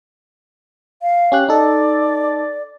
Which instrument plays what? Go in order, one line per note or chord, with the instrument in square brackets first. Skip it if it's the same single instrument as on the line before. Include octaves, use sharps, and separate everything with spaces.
[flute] F5
[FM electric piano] C#4 G4 F#6
[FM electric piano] D#4 A4 [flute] D5